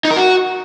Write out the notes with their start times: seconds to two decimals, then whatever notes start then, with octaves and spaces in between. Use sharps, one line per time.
0.05 D#4
0.11 A#4
0.16 F#4